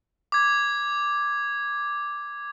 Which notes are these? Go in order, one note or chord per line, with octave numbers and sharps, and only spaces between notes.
D6 G#6